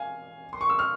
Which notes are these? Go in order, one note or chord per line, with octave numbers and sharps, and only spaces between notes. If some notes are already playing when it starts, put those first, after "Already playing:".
Already playing: F5 G#5
C6
C#6
E6
F6